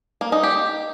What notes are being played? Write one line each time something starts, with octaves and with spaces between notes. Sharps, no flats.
A#3
D#4
G4